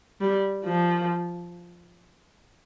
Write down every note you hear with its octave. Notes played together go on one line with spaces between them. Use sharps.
G3
F3